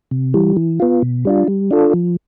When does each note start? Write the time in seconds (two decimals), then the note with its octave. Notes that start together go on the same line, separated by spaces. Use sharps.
0.11 C3
0.34 E3 G3
0.57 E3
0.80 B3 F4
1.02 B2
1.25 G3 D4 F4
1.48 G3
1.71 D4 F4 A4
1.94 F3